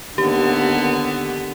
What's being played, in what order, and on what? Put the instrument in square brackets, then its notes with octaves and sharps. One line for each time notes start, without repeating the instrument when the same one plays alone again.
[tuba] D#2 [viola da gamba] D3 B3 [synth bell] G4